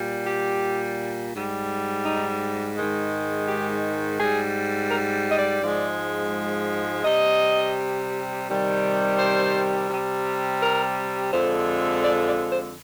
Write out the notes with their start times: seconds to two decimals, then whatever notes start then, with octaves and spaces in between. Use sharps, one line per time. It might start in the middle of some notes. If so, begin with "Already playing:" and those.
Already playing: A#2 G3
0.27 G4
1.34 G#2 G3
2.06 D#4
2.77 G#2 D#3 G#3
3.48 G4
4.20 G#2 G3 G#4
4.90 A#4
5.31 D#5
5.38 D5
5.62 G#2 F3 G#3
7.04 C3 G3 D#5
8.48 C3 D#3 G3
9.19 C5
9.90 C3 G3
10.61 A#4
11.32 F2 D3 F3 G#3 C5
12.04 D5
12.27 D5
12.52 C5